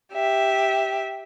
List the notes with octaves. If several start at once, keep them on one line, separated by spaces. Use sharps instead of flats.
G4 E5